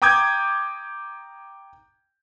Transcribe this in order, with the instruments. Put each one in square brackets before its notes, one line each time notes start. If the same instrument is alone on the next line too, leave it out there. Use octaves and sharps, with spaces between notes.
[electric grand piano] G5 A#5 D6 D#6 G6 G#6